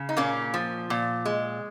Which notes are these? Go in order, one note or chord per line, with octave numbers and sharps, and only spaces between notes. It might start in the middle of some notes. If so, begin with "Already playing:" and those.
Already playing: C#3
D#4
A#2 A#3 C#4
F3
A#2
G#3